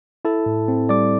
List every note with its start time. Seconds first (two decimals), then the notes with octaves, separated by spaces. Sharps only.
0.25 E4 A4 A5
0.46 A2
0.68 C4
0.89 G3 D5 D6